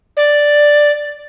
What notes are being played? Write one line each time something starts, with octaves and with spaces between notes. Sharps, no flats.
D5